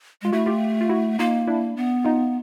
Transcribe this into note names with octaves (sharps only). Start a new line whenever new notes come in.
G#3 F4
A3 E4 F#4
F4 G4
F4
E4 F#4
A#3 D#4 F4
D4 E4
B3
D#4 F4